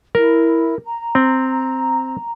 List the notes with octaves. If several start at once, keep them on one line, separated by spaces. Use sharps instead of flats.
E4 A#4
A#5
C4